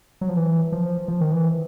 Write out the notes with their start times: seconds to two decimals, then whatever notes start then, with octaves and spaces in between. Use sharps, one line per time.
0.21 F#3
0.29 F3
0.36 E3
0.72 F3
1.08 F3
1.21 D#3
1.32 E3